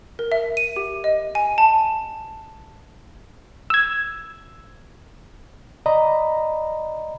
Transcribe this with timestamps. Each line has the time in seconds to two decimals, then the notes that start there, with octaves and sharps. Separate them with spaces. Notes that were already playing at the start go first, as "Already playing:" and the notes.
0.19 A#4
0.32 E5
0.57 D#7
0.76 G4
1.04 D#5
1.35 G#5
1.58 A5
3.70 E6 G#6
5.86 D5 D#5 A#5 B5